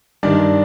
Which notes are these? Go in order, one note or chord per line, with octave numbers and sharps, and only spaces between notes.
G2 D#3 D4 D5